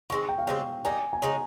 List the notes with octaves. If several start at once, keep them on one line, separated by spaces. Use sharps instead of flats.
D#3 G#3 C4 C#6
G5
F5
C#3 G#3 C4 G4 G5
G3 A#3 D#4 G#5
G#5
C#3 G#3 D#4 A#5